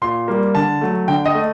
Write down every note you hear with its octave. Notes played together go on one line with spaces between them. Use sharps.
A#2 C6
G3 A#3
D3 A5
F#3 A3
D3 G5
D#5
A3